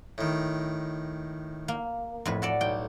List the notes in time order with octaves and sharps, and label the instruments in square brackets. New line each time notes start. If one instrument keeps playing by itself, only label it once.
[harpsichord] A2 D#3
[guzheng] A#3
F2 A2 B4
F#4 A4 D5
[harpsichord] B1 [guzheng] G5